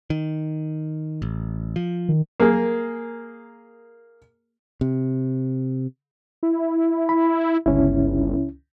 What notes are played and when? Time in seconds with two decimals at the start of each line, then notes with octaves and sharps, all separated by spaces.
0.10 D#3
1.22 A1
1.76 F3
2.09 D#3
2.40 A#3 G#4 A#4
4.81 C3
6.43 E4
7.09 B5
7.66 G1 C#2 C#4 E4